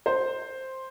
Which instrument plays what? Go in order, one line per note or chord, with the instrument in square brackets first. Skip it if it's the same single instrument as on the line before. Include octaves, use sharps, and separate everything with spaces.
[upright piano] C5